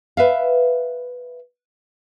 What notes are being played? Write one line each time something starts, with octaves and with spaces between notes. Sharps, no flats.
B4 E5 F5